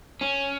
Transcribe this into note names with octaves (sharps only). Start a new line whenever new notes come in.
C#4